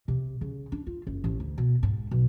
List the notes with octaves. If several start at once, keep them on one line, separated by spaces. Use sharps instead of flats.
C3
C#3
D4
F4
F#1
A1
D2
B2
G#2
B1